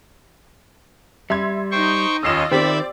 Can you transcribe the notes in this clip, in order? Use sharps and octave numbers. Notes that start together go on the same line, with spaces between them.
G3 E5 C6 G#6
D#4 C5 G5 C#6
D#2 C#4 F4 D#5 E6 C7 E7
D#3 C4 G4 C5 D5 E5 B5